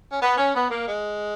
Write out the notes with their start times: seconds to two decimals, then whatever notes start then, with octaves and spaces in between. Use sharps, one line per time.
0.11 C#4
0.22 B3
0.37 C#4
0.55 B3
0.71 A#3
0.87 G#3